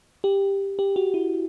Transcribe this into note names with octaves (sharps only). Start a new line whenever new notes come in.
G4
G4
F#4
E4